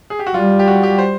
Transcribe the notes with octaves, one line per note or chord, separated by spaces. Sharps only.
G#4
G4
F#4
G3 F4
G4
F#4
G4
C5